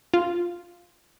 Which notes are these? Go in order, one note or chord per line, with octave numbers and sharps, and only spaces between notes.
F4